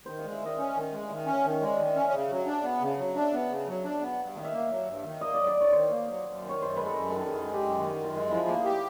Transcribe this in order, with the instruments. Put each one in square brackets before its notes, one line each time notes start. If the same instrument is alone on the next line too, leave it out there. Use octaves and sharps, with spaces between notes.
[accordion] D#3 [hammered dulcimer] C5
[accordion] G#3 [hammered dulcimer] F5
[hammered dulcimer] E5
[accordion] D#3 [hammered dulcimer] D#5
[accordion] C#4
D#3
G#3
[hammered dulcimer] F5
[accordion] D#3 [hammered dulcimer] E5
[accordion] C#4
[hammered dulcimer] D#5
[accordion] D#3
[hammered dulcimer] C#5
[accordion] G#3 [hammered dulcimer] D5
[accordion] D#3
[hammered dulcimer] E5
[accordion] C#4
[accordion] C#3 [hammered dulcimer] D#5 E5
[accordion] F#3
D4
B3
C#3
F#3
[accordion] D4 [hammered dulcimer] E5
[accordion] B3
C#3
F#3
D4
B3
G2
[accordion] D#3 [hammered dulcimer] F5
[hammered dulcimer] E5
[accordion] A#3
F#3
G2
D#3
[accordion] A#3 [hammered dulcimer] D#5
[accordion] F#3 [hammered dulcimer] D5
[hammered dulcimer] D5
[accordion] G2
[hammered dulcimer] C#5
[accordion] D#3 [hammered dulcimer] C5
[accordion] A#3
F#3
F#2
D#3
[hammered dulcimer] C#5
[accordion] F#2 [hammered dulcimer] C5
[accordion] G#3 [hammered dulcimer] B4
[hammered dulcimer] A4
[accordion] F#2 [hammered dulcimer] A#4
[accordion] D#3 [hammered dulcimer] A4
[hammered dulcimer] A4
[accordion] F#2 [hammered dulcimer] G#4
[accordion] G#3
[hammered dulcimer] G4
[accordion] F#2
[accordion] D#3 [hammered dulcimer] F#4
[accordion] F#2
[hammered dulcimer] F4
[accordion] G#3
[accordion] F3 [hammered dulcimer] E4
[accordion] A#3
[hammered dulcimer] D#4
[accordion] G4